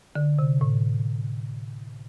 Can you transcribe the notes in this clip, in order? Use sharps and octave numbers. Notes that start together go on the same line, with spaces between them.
D3
C3
A2